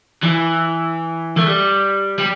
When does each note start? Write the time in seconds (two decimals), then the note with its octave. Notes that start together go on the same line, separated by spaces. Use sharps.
0.23 E3
1.36 A3
1.46 G3
2.18 G3